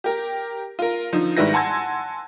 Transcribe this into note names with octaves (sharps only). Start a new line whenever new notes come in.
G4 A#4
F4 A#4
D3 F3 D#4
G#2 D#3 G3 E4 B4 A#6
F#5 G#5 A5 C6 E6 G#6